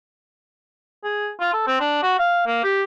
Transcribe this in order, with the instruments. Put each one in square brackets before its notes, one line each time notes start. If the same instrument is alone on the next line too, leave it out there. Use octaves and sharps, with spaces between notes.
[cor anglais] G#4
F4
A4
C4
D4
F#4
F5
A#3
G4